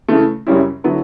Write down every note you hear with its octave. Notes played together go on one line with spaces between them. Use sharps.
C#3 E3 A3
F#2 C#3 G3 C#4 E4
D3 F#3 B3 E4